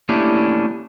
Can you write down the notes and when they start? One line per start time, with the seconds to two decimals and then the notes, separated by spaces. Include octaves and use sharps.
0.09 A3 A#3 C#4 D4 E4 G4